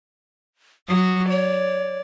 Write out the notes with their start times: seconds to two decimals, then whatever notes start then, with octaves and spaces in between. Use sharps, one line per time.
0.88 F#3 F#4 D#6
1.29 C#5 D5